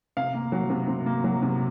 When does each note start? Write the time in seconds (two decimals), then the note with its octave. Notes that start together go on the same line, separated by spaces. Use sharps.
0.17 C3 F5
0.34 A#3
0.52 F#3
0.70 C3
0.88 C3
1.06 A#3
1.24 F#3
1.42 C3